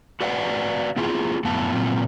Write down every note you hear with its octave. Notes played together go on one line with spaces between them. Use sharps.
F#4 B4 D5 F5 F#5
B3 E4 F4 G#4
F#2 A2 B3 E4 F5 A5
A#2 F#3 C4 F4